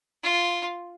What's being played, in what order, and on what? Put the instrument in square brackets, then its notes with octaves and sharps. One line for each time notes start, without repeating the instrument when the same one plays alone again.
[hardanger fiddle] F4